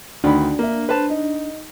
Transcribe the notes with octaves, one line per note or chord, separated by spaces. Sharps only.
D2 D#3 D4 B5
A#3 E5
B4 C5 A5
D#4